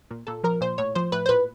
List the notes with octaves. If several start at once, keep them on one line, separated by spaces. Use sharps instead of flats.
A#2
A#2 A4
F3 A#4
A#2 C5
A2 C#5
F3 C5
A2 B4
C5
A#2 B4